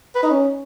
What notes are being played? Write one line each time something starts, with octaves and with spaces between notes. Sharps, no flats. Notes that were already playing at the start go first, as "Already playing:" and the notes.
B4
D#4
C#4